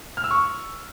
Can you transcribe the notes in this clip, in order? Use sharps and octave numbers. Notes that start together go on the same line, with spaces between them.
F6
E6
C#6